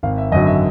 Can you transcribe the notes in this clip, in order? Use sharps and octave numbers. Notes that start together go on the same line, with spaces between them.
G#1 F5
E5
F#2 D3 F#3 D#5
E5